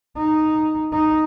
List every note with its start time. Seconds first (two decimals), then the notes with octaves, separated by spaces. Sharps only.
0.17 D#4
0.93 D#4